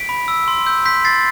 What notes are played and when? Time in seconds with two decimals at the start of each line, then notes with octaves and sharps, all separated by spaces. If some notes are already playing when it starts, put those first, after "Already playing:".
Already playing: B6 D7
0.09 B5
0.28 E6
0.48 C6
0.66 E6 G6
0.85 C6 G6 B6
1.05 C6 A6 C7